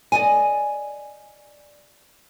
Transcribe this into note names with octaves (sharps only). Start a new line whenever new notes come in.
D5 D#5 G#5